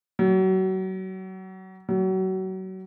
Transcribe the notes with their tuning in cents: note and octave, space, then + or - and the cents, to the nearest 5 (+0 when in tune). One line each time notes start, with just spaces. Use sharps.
F#3 +30
F#3 +30